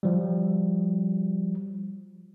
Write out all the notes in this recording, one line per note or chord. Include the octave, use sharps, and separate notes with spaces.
F3 G3